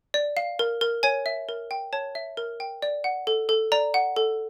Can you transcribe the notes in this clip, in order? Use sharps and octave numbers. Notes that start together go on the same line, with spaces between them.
D5
F5
A#4
A#4
C#5 G#5
E5
A#4
G5
C#5 A5
E5
A#4
G5
D5
F#5
A4
A4
D5 A#5
F#5
A4